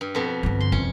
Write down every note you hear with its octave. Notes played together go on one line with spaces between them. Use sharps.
G2
F2 B2
G2 D3
C6
C2 F2 C#4